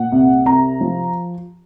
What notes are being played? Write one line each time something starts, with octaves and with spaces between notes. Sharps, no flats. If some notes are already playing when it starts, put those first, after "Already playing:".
Already playing: A#2 F#5
C2
C2 A#5
F3